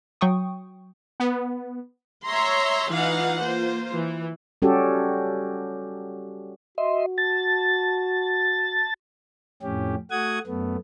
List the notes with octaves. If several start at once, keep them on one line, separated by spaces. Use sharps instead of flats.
F#3 G5 C#6 D#6
B3
C#5 E5 A#5 C6
E3 D#4 F4 F5 F#5
A#3 F4 C5
E3
G3 C#4 F#4 G4 A4
F#4 D#5 E5 C6
A5 A6
F2 A2 C#4 G4
A3 F#4 F#5 D#6 G#6
F#2 A3 B3